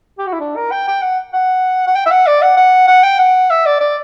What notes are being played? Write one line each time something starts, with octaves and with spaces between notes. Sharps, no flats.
G4
F#4
E4
D4
A#4
G5
G5
F#5
F#5
F#5
G5
E5
F#5
D5
F#5
F#5
F#5
G5
F#5
E5
D5
D5